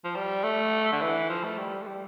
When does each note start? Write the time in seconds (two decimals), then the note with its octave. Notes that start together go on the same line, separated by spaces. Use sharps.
0.05 F3
0.16 G3
0.44 A3
0.92 D3
1.02 E3
1.29 F3
1.44 A3
1.58 G3
1.82 A3
1.87 G3